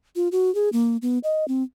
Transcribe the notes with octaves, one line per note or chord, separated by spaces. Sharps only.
F4
F#4
G#4
A#3
B3
D#5
C4